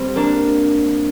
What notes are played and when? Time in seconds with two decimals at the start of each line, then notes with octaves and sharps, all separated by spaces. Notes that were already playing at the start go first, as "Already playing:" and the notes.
Already playing: G3 C4
0.16 A#3 D4